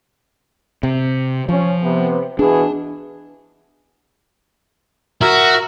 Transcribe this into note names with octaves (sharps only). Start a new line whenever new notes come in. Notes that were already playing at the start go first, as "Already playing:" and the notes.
C3
F3 C#4 C#5
C3 B3
B2 E3 D4 G#4
F#4 A#4 E5